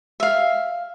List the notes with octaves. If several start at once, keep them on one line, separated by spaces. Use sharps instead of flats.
E5 F5